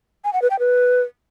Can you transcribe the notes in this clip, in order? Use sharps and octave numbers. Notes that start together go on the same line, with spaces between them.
G#5
F#5
B4
G5
B4